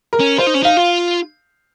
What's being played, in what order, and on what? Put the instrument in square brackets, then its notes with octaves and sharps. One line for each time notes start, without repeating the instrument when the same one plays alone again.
[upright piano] A#4
[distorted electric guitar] C#4
[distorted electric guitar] F4 [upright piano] C5
[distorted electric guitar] D#4
C#4
[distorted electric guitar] D#4 [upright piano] F5
[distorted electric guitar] F4